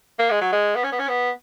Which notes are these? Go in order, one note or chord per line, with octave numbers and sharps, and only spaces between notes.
A#3
G#3
F#3
G#3
B3
C#4
B3
C#4
B3